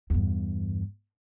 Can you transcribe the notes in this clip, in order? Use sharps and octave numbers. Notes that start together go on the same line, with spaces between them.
E2 G2